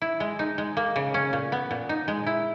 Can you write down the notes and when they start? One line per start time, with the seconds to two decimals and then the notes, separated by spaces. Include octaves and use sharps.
0.02 E4
0.20 G#3
0.39 D#4
0.58 G#3
0.77 A#3
0.96 C#3
1.14 C#4
1.33 A#2
1.52 B3
1.71 A#2
1.89 D#4
2.08 G#3
2.26 E4